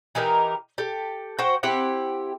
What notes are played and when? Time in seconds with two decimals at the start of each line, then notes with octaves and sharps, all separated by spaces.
0.15 E3 D#4 G4 A#4
0.78 G4 A4
1.39 F#4 C5 F#5 G5
1.63 C4 E4 G4 F#5